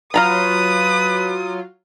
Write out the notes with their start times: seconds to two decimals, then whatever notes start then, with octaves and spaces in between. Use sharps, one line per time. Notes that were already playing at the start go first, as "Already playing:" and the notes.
0.14 F#3 F4 B4 F5 A#5 B5 D#6